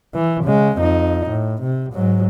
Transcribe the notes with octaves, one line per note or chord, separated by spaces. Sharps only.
E3
C#3 G#3
F2 D#4
A2
C3
G#2 F#3